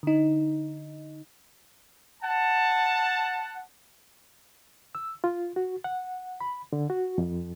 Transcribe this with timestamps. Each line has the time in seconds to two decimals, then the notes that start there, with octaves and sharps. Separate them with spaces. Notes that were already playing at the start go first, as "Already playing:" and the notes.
0.03 D3 D#4
2.23 F#5 A5
4.95 E6
5.24 F4
5.56 F#4
5.84 F#5
6.41 B5
6.73 D3
6.90 F#4
7.18 F2